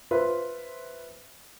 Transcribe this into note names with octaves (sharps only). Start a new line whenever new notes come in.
F4 B4 C5 E5